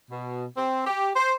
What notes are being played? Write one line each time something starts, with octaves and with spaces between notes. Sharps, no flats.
B2
C4
G4
C5